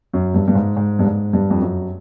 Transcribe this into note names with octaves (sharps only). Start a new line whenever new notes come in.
F#2
G2
G2
G#2
G#2
G2
G#2
G2
F2
F#2